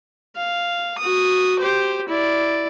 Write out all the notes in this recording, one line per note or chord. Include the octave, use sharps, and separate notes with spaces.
F5
F#4 D#6
G4 C5
E4 D5